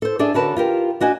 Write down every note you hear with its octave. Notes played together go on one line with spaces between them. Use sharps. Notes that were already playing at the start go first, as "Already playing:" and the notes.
A4 C5
D4 G#4 A4 D5 E5
D3 F#4 A#4 B4 C#5 A5
F4 G4 A#4 G5
D4 F#4 D#5 G#5